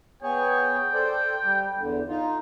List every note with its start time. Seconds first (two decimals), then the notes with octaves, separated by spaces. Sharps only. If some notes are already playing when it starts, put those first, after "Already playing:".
0.23 B3 G#4 C#5 G5
0.94 A4 C5 D5
1.44 G3
1.78 E2 D3
2.08 D#4 F4